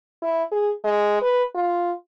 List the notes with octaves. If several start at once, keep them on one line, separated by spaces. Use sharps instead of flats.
E4
G#4
G#3
B4
F4